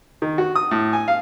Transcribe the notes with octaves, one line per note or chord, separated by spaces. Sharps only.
D#3
F#4
D#6
A2
G#5
F5